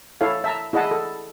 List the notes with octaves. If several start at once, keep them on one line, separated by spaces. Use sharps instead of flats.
E4 A4 C#5 F5
E5 A5 A#5
E4 G#4 D#5 F#5 A5 B5
A4